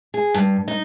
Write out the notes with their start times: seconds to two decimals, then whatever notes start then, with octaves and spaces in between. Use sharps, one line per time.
0.14 G#4
0.34 G2
0.68 D#4